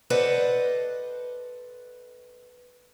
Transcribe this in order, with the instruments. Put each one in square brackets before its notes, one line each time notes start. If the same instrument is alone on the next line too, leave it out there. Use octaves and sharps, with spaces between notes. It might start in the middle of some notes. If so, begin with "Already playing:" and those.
[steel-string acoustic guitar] A4 B4 C5 D5 D#5 F#5